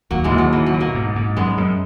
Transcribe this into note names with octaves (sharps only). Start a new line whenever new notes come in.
D#2 F#3 A#3
E3 G#3
D#2
F#3
B2 E3
F#3
B2
F#3 A#3
G#2
G#2
F#2 G#3 B3
F#2